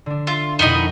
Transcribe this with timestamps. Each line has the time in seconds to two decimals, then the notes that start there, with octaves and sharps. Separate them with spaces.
0.06 D3 D4
0.27 F4 E5 F5
0.59 F2 B2 D#4 E4 D#5
0.75 A4 A#4